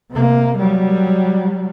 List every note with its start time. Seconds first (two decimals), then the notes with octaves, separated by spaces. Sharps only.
0.11 C3 A#3
0.59 F#3 G3